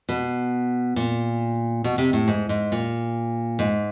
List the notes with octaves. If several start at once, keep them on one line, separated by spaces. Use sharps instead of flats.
B2
A#2
B2
C3
A2
G#2
G#2
A#2
G#2